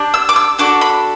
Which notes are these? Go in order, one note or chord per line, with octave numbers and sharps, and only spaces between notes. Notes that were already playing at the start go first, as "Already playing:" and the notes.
Already playing: D4 G4
E6
D6
E6
D4 F#4 A4 D6
B5